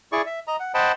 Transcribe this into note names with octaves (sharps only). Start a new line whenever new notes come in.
E4 G#4 D5 C#6
E5
D#5 A#5
F#5
C5 D#5 F#5 G5 A5 B5